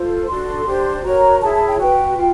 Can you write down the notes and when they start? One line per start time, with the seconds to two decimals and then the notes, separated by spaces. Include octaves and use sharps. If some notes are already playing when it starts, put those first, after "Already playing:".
Already playing: F4 A4 C5
0.28 D4 F#4 A4 C6
0.66 D4 G4 C5
1.04 F#4 A#4 C#5 A#5
1.42 E4 G#4 C#5 A5
1.54 A5
1.67 G5
1.80 F#4 B4 G5
2.17 F4